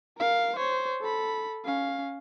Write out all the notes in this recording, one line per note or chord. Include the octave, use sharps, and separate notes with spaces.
A#4 F5
C5 C#5
A4 B5
C#4 F5